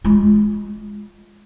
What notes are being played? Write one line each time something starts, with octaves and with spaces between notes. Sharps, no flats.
G#3 F4